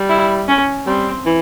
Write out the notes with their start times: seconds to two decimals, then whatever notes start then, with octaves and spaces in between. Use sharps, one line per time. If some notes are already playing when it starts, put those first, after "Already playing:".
Already playing: G3
0.09 E4
0.48 C#4
0.86 G3 C4
1.26 E3